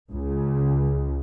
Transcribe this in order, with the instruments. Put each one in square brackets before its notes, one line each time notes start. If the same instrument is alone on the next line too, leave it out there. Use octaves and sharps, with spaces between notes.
[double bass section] C#2